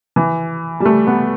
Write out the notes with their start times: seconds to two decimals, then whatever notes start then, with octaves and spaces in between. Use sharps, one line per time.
0.16 E3
0.80 G3
0.85 A3
1.07 B3